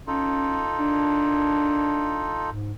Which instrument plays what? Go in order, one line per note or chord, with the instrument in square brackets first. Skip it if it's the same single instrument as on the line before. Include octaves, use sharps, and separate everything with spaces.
[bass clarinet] C#4 [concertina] D#4 F4 A4
[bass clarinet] D4
G#2